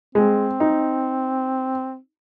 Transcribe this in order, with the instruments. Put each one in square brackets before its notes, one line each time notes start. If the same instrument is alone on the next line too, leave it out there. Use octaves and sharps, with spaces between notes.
[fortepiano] G#3 [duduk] C4
[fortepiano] D#4